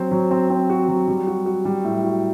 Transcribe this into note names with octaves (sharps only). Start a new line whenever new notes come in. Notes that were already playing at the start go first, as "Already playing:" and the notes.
Already playing: F#3 C4 C5
F#3
C4
C4
F#4
F#3
G3
F#4
F#4
G3
A2
F#4